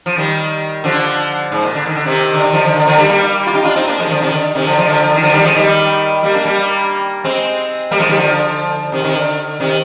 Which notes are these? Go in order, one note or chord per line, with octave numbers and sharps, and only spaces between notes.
F3
D#3 G3
D3 F3
G#2
A#2
D3
D#3
D3
C3 D#3
D3
D#3
D3 F3
D3 F3
D3
D3 F3
D#3 G3
G3 A#3
F4
D#4 G4
D4 F4
C4 D#4
A#3 D4
F3 G#3
D#3
D3 F3
C3 D#3
D3
C3 D#3
D3 F3
F3 G#3
D3 F3
D#3
D3 F3
D#3 G3
F3 G#3
D#3 G3
G3 A#3
A#3 D4
G3 A#3
G#3 C4
G3 A#3
F3 G#3
D#3 G3
D3 F3
C3 D#3
C3 D#3
D3
C3 D#3